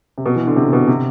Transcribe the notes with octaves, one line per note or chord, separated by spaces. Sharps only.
C3
B2
E3
D3
C3
B2
C3